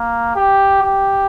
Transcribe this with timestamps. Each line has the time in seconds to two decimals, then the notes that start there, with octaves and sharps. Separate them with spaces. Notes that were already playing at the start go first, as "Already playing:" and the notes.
Already playing: A#3
0.35 G4
0.83 G4